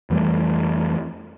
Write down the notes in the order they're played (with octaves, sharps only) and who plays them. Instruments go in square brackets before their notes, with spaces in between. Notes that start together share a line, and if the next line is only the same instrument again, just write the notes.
[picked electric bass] F2 E3 G3 A3